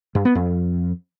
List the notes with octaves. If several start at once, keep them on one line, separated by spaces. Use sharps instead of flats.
G2
B3
F2